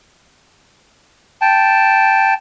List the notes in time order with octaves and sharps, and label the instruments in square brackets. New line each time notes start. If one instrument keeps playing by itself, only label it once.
[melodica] G5 A5